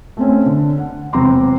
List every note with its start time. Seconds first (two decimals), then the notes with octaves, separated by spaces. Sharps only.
0.17 A3 C4 C#4
0.46 D3
0.78 F#5
1.13 E1 C3 C4 A#5 C6 D6